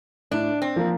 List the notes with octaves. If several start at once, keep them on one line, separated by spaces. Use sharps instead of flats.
A2 D4
C4
F3 A#3